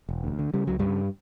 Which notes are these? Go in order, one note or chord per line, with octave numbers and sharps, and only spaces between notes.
E1
D2
D3
C#3 G3
C#2 F#3
G2 C#3 G3